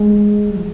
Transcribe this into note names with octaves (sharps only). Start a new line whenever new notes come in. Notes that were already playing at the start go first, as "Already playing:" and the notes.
Already playing: G#3
G3
F3